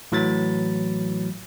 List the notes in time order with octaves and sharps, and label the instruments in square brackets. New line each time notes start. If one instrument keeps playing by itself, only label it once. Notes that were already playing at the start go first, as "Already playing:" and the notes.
[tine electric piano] A2 E3 F#3 B5 A6